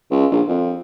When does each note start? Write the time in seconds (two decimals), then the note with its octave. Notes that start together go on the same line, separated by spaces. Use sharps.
0.11 C#2
0.31 A#1
0.48 F2